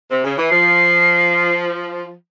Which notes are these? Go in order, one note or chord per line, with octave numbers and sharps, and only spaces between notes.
C3
C#3
E3
F3 C7